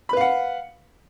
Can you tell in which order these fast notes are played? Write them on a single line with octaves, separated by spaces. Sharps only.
B5 B4 F5 F#5